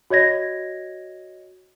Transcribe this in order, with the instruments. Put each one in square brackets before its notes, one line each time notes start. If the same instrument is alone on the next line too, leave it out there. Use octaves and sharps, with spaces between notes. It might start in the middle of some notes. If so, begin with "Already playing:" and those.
[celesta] F#4 C#5 D#5 G#6 A#6